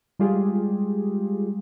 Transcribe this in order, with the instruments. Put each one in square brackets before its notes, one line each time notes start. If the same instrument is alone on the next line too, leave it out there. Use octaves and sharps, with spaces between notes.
[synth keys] G3 G#3 F4 G4 G#4